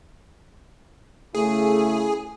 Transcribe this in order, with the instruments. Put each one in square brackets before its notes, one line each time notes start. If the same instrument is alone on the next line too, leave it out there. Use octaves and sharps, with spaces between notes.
[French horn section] C#3 A3 E4 [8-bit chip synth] G#4